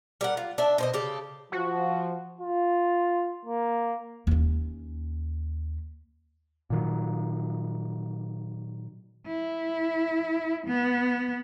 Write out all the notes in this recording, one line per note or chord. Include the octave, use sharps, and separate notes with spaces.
G3 A#4 F#5
F4
D4 E5
B2 C5 D#5
C#3 G4 A4
F3 F#4
F4
A#3
D#2 C#4
A#2 D#3 F#3
E4
B3